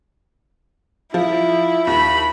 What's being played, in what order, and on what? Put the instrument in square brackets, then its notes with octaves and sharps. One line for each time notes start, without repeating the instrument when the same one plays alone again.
[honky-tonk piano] F3 [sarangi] E4
[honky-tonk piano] D#2 [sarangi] B5